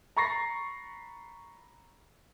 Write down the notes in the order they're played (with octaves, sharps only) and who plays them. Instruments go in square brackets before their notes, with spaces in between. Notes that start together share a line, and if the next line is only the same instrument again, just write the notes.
[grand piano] A#5 B5 C#6 A6 A#6 C7